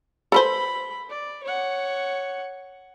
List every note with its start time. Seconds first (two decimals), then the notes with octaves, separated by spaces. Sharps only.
0.32 A4 B4 C5 B5
1.09 D5
1.43 C#5 F#5